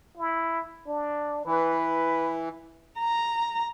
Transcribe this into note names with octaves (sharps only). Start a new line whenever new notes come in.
E4
D4
E3 B4
A#5